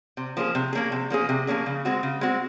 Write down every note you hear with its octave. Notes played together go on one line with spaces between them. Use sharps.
C3
F3 A#3 C#4 G#4
C3
F3 A#3 C#4 G#4
C3
F3 A#3 C#4 G#4
C3
F3 A#3 C#4 G#4
C#3
G#3 C4 F#4
C#3
G#3 C4 F#4